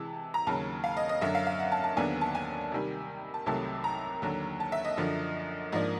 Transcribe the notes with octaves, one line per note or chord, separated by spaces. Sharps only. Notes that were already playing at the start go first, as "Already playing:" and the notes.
Already playing: C3 E3 G#3 A5
A#5
D#2 C#3 F#3 A5
F5
D#5
D#5
F#2 D3 F#3 E5
F5
F5
F#5
A5
A5
D#2 D3 F#3 B3 D4 G#5
A5
G#5
C3 D#3 G3
A5
C2 C3 D#3 F#3 A3 A5
A#5
D#2 D3 F#3
A5
E5
D#5
F#2 D3 F3
G#2 F3 A#3 D4 D#5